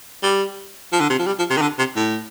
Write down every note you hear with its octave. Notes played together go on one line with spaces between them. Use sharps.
G3
F3
D3
C3
F3
G3
F3
C3
D#3
D3
C3
A2